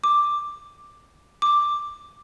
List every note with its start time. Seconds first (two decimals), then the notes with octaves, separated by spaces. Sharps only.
0.04 D6
1.42 D6